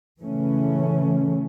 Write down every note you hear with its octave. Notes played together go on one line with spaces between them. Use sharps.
C#3 E3 A3 C#4